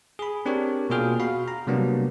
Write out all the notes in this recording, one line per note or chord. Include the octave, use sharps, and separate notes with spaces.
G#4 B5
C4 D4 G4 A#4 C#5
B2 A#3 F4 G#4 G5 F6
F#4 F5 B5
A#5
C3 F#3 G3 A#3 B3 D4